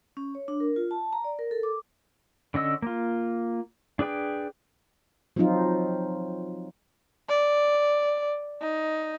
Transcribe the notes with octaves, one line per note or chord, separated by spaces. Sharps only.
C#4
C#5
D4
A#4
F4
A5
A#5
D5
A#4
A4
D6
D3 C#4 D#5 E6
A#3 F4
D4 G#4 B4 G5
F3 F#3 C4 D#4 F4
D5
D#4